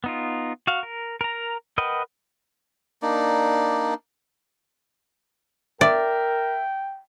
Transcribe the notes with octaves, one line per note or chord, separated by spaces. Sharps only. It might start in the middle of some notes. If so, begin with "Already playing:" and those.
B3 D#4 F4
F#4 F5
A#4
A#4 A#5
A#4 B4 D#5 F#5 G5
A#3 D4 D#4 D5
A#4 D5 E5 G5